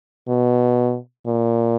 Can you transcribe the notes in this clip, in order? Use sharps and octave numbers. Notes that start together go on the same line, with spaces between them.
B2
A#2